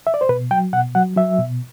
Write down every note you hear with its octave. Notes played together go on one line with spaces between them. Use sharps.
E5
D5
C5
B2 B4
F#3 G5
B2 F#5
F#3 F#5
F#3 E5
B2